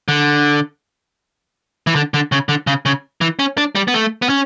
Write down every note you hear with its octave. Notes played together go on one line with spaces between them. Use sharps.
D3
E3
D3
D3
C#3
D3
C#3
C#3
E3
C#4
D4
G3
B3
A3
B3
C#4